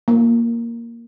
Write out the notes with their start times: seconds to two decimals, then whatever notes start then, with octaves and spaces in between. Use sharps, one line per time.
0.08 A#3